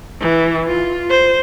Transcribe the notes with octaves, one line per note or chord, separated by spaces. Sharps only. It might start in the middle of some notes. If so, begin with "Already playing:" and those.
E3
F4
C5